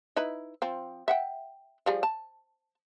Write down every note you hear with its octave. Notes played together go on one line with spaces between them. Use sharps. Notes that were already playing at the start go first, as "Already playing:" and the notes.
D#4 E4 B4
F3 C4
E5 F#5 G5
F3 G3 G#4
A5